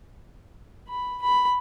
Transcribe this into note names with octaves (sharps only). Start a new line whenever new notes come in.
B5
B5